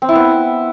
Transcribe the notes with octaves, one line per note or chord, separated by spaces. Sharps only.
C4
E4
B3